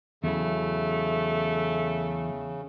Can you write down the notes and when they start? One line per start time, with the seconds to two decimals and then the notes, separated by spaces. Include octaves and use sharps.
0.24 E2 C#3 F#3 A3 E4